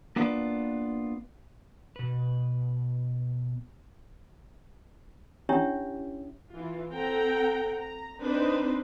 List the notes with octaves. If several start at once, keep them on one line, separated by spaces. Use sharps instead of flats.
A#3 B3 D4 F4 B4 D5
B2 B4
C#4 D4 E4 G4 C#5 E5
E3 F4
C4 A4 F#5 G5 A#5
A#5
C4 D4 D#4 B4 C5